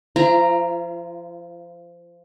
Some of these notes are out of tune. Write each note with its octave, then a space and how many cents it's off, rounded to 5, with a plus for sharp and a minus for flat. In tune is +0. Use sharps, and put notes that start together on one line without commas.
F3 -20 F4 -45 A#5 +0